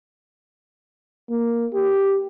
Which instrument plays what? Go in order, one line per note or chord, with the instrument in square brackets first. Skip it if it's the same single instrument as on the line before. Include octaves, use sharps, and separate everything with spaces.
[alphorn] A#3
G4